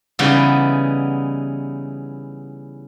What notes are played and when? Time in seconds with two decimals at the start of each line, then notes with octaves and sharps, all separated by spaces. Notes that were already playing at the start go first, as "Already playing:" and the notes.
0.19 C#3 E3 G3 B3 D#4